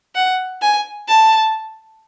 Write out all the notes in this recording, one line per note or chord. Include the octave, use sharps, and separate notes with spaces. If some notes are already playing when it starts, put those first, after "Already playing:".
F#5
G#5
A5